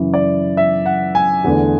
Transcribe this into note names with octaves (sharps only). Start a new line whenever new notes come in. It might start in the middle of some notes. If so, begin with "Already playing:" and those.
Already playing: F#2 C#3 E3
D5
E5
F#5
G#5
E2 D3 A3